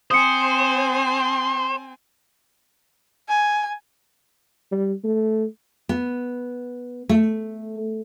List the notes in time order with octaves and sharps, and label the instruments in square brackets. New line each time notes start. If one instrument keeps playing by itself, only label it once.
[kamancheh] C4 G#5 [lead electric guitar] C5 [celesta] D#6 C#7
[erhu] G#5
[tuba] G3
A3
[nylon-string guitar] B3
A3